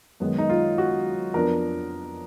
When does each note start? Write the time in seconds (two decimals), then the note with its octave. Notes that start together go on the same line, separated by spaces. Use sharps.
0.20 F#2 D#3 G#3 B3
0.38 D#4
0.49 F4
0.78 F#4
1.34 F2 F3 B3 D4 A#4